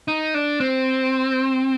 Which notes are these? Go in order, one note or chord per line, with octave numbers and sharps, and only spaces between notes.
D#4
D4
C4